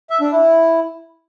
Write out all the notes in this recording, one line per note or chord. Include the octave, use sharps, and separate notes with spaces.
E5
D4
E4